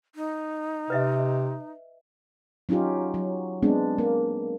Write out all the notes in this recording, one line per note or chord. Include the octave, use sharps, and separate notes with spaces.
D#4
C3 B4 D#5 E5
F#3 C#4 D#4 F4 G4
F#3
G#3 B3 C4 D4
A#3